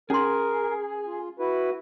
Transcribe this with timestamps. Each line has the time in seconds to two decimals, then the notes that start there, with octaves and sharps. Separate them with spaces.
0.10 C#4 G#4 A#4 C6
1.06 F4
1.39 E4 F#4 B4